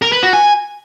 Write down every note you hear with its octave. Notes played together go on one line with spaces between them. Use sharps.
A#4
B4
F#4
G#5